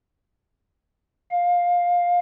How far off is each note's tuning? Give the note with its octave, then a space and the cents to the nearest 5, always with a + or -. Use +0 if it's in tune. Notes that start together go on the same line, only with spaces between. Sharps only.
F5 +15